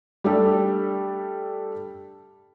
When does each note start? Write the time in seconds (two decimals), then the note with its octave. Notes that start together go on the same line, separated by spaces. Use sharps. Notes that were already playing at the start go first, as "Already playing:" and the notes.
0.24 G3 A3 D4 G4 A4